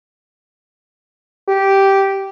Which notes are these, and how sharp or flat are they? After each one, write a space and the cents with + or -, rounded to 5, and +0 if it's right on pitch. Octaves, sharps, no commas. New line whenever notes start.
G4 -10